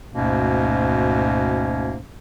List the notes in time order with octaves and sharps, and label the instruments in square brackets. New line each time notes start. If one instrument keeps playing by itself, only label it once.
[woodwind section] D2 G#2 B2 A#3 C#4